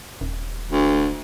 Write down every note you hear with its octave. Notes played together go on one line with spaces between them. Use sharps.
D#1
D2